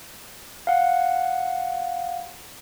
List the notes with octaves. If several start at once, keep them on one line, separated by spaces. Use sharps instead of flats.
F5 F#5